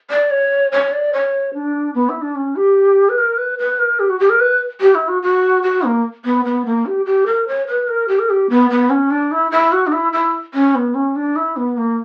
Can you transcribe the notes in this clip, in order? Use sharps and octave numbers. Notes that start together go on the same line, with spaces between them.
D5
C#5
C#5
D5
C#5
D4
B3
E4
D4
C#4
G4
B4
A#4
B4
B4
A#4
G4
F#4
G4
A#4
B4
G4
E4
F#4
F#4
F#4
A#3
B3
B3
A#3
G4
G4
A#4
C#5
B4
A#4
G4
A#4
G4
B3
B3
C#4
D4
E4
E4
F#4
D4
E4
E4
C#4
B3
C#4
D4
E4
B3
A#3